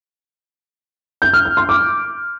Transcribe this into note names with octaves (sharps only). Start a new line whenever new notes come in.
G6
F6
G6
C6
D6